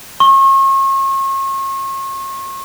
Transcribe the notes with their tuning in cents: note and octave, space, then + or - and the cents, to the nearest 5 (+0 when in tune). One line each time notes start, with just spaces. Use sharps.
C#6 -40